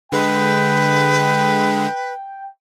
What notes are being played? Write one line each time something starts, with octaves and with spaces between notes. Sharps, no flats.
D3 G#3 B4 G5